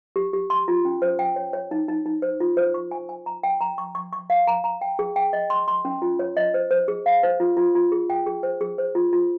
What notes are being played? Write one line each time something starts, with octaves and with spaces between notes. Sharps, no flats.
G4
G4
C6
F4
C#4
C5
G5
C#5
C#5
D#4
D#4
D#4
C5
F4
C5
C#6
G#5
G#5
A#5
G5
A#5
C#6
C#6
C#6
F5
A#5
A#5
G5
G#4
G5
D#5
C6
C6
C#4
F4
C#5
D#5
C5
C5
G#4
F5
C5
F4
F4
F4
G#4
G5
G#4
C5
G#4
C5
F4
F4